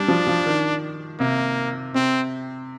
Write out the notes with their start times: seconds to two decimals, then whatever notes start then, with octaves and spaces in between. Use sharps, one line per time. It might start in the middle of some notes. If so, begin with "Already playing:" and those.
Already playing: G3 D4
0.08 F3
0.27 F3
0.46 D#3
1.20 C3 A#3
1.94 C3 C4